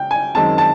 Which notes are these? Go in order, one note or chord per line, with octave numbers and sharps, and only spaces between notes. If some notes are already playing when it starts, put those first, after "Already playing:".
Already playing: C#3 G5
G#5
F#2 D#3 G#3 C4 A5
A5